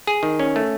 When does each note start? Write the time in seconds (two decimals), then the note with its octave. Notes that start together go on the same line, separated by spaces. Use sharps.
0.07 G#4
0.23 D#3
0.39 C#4
0.56 A3